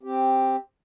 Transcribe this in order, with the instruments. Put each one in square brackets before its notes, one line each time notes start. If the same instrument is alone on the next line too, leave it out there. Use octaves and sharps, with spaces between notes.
[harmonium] C4 G4